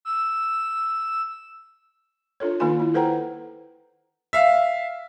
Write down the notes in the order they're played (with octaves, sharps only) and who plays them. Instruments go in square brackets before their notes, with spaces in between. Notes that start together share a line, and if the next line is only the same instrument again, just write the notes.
[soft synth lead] E6
[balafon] D4 F4 A4 C#5
D#3 A#3 D#4 F4 G#5 C6
E4
A4 B4 C5 F#5 G5 A#5
[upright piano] E5 F5